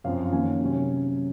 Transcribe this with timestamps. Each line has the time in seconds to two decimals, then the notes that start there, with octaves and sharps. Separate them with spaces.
0.04 F#2 F3 C4 F5
0.32 D#3 A#3 C#4 G#5
0.60 C3 F#3 C#4